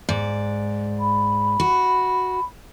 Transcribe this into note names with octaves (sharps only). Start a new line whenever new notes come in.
G#2 D5
B5
F#4